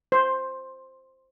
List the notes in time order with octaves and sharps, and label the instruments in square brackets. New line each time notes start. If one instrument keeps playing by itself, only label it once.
[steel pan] C5